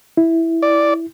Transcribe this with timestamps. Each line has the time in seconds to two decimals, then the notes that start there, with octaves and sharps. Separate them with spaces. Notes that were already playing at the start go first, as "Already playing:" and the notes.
0.17 E4
0.62 D5